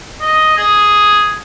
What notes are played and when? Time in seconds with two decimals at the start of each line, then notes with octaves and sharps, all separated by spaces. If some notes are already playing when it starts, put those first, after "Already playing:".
0.21 D#5
0.57 G#4